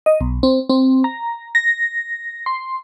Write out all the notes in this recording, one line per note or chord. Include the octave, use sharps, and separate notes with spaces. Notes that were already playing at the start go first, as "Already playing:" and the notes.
D#5
B1
C4
C4
A#5
A#6
C6